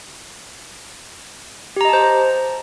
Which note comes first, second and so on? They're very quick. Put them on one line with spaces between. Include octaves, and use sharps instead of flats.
G4 A#5 D#5 A5 C5